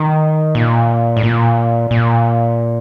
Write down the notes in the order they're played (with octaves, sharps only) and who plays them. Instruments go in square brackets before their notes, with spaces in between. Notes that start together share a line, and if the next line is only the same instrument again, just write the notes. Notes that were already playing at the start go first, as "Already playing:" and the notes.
Already playing: [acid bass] D#3
A#2
A2
A#2
A#2